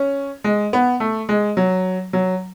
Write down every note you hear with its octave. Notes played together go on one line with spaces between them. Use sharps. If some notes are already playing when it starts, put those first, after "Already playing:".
Already playing: C#4
G#3
B3
A3
G#3
F#3
F#3